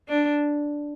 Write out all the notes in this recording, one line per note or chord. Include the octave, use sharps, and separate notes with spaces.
D4